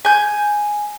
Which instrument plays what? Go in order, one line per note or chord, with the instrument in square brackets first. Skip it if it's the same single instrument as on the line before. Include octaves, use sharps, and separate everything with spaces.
[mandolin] G#5 G6